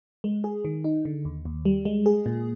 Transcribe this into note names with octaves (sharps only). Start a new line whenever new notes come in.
G#3
G#4
D#3
D#4
D3
D#2
D#2
G3
G#3
G#4
A#2